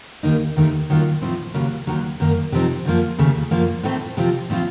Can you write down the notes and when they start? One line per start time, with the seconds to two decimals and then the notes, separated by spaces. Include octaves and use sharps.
0.23 D#2 D#3 A#3 D#4
0.57 D#2 D#3 A3 D#4
0.90 D#3 F#3 A#3 F4
1.22 A2 F3 C4 D#4
1.54 D#2 C#3 F#3 A#3
1.87 D#2 D#3 F#3
2.20 F#2 D#3 A#3
2.52 C3 F3 C4 D#4
2.85 F#2 F3 A#3
3.18 D#2 C#3 A3
3.51 F#2 F3 A#3
3.83 A2 A3 C4 D#4
4.17 C3 F3 C4 F4
4.50 A2 F3 C4 F4